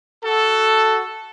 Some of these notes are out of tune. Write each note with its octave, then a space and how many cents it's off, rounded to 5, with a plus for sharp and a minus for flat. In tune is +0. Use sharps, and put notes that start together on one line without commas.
F#4 +15 A4 +0